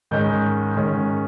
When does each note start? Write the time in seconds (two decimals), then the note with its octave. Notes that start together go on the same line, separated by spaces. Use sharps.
0.11 G#2 D#3 G#3 C#4 G6
0.76 G#2 D#3 G#3 C#4